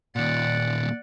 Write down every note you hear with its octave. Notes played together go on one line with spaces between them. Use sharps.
D#2 A#2 D5 F#5